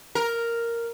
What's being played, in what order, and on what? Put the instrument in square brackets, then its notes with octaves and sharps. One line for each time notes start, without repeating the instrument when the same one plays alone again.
[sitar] A#4